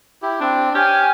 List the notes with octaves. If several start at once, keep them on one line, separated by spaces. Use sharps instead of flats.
E4 G4
C4 D4
G4 C#5 G#5 F6